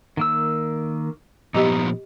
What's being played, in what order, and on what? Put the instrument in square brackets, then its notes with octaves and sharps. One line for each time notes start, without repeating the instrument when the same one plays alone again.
[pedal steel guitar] D#3 A#3 E6
[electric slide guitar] A#2 F3 B3 [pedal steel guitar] D#4 [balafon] G4 D#5 D6